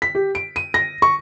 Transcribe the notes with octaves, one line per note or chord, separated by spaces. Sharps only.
B6
G4
D7
D#7
A#6
C#6